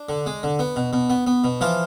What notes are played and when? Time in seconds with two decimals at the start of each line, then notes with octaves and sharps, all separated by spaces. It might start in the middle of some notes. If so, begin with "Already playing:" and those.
Already playing: D4
0.09 D3
0.26 G#3
0.43 D3
0.59 B3
0.76 B2
0.93 B2
1.10 B3
1.27 B3
1.44 B2
1.61 E3 F3 F4